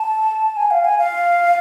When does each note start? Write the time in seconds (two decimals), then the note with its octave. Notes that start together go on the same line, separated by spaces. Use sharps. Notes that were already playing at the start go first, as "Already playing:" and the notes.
Already playing: A5
0.57 G#5
0.71 F5
0.84 G#5
0.99 F5